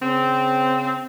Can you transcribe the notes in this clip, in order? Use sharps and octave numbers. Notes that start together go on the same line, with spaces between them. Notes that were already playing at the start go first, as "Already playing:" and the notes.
C#3 C4